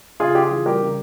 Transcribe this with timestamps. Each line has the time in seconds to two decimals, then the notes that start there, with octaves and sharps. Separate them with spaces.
0.20 C#3 F4 G#4
0.35 C#3 G4
0.43 F4 G#4
0.51 E3
0.66 G3 G4 A#4
0.81 C#3